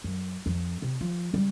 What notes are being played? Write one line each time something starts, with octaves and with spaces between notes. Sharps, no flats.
F#2
F2
C3
F3
C#3 G3